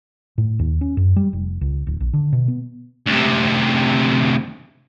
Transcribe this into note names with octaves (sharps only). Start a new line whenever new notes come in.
A2
D#2
C#4
F#2
G3
F1
C#2
D1
A#1
D3
B2
B3
D2 C3